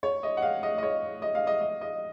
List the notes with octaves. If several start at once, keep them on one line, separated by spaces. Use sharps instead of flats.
C#5
D#5
F#5
F5
D#5
D#5
C#5
D#5
F5
D#5
D#5
D#5